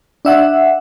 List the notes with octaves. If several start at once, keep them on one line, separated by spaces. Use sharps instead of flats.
D4 E5 F#5